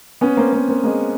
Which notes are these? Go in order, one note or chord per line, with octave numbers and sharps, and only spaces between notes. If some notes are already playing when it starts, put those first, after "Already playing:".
B3 C#4
A#3 C4
A#3 C4
A#3 C4
G#3 A#3